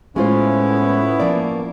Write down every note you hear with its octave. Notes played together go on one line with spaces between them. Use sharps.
A2 G#3 B3 C#4 E4 F4 C5
F3 A#3 D5